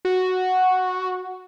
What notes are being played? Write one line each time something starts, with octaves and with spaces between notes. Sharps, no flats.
F#4